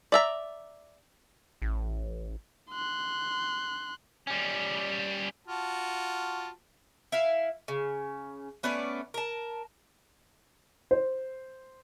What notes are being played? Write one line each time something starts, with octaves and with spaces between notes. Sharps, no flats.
D5 E5 A#5
A1
C6 F#6
G3 C#4
F4 F#4 A5
E4 E5 F5
C#3
A3 B3 C#4 D5
A#4 A5
C5